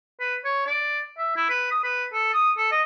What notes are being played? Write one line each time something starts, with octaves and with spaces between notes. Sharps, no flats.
B4
C#5
D5
E5
E4
B4
D#6
B4
A4
D#6
A4
D#5